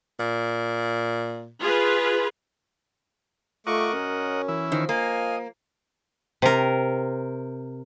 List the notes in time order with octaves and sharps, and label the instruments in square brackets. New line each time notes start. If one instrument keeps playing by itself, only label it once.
[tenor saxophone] A#2
[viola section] F4 G#4 B4
[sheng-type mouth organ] A3 C#6 D6 [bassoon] F4 [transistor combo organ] A#4 D#5 F#5
[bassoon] F#2 [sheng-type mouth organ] C#4
[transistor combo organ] E3 E4
[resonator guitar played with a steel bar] D#3 [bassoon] F3
[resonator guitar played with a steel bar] A#3 [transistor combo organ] D#5 [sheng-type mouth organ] F5 G#5
[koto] C3 A#4